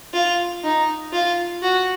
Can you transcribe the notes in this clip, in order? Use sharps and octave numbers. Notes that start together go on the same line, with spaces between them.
F4
D#4
F4
F#4